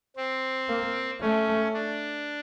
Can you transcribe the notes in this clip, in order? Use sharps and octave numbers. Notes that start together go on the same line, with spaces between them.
C4
A#3
A3 C#4
D4